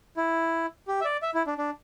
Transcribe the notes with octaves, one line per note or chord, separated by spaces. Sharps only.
E4
G4
E5
D5
E5
E4
D4
D4